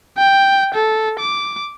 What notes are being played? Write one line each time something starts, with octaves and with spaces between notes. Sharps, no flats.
G5
A4
D6